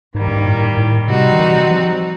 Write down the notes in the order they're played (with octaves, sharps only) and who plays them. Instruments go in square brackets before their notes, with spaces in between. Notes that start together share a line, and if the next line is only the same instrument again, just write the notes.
[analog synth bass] G#2 [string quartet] D#3 G3 A#3
[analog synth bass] G2
G#2
A2
A2
[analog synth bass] C3 [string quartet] G3 C4 D#4 F#4
[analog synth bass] D#3
E3
F3